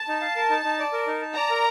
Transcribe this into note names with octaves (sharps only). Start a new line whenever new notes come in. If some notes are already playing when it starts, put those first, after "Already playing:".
Already playing: A5
D#4
F5
A#4
D#4
D#4
D5
A#4
D#4
A5
D5 A#5
A#4